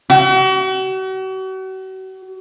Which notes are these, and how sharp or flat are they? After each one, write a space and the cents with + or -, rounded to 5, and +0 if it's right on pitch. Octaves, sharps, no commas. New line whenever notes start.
F#4 +40